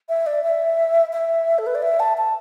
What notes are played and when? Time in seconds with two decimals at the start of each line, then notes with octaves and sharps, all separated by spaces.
0.09 E5
0.26 D5
0.44 E5
1.13 E5
1.58 A4
1.67 B4
1.75 D5
1.82 E5
2.00 A5
2.17 A5